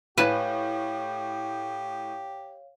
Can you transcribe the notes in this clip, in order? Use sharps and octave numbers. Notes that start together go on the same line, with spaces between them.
A2 G4 B4 C#5 F5 G#5 A5